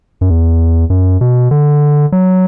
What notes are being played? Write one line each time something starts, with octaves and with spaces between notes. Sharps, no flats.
F#2
E2
F#2
B2
D3
F#3